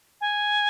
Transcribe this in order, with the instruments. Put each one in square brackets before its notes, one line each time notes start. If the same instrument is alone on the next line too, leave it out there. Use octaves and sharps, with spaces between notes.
[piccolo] G#5